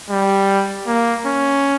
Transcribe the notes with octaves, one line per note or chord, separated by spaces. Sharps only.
G3
A#3
C#4